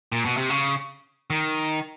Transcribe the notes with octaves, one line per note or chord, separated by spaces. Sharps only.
A#2
B2
C3
C#3
D#3